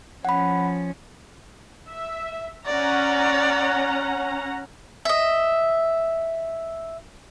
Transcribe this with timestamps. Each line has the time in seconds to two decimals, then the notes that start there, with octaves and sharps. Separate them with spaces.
0.25 F3 C#4 F#5 B5
1.91 E5
2.66 C#4 D5 F#5 A#5
5.05 D#5 E5